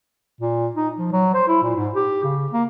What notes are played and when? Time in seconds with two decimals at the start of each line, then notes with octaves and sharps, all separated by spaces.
0.41 A#2
0.75 D#4
0.98 F3
1.12 F#3
1.34 C5
1.48 E4
1.62 A#2
1.76 G#2
1.95 G4
2.24 C#3
2.52 A#3